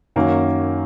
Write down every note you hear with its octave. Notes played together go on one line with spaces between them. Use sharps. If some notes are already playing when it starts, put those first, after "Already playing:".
F#2 D#3 A#3 C#4 F#4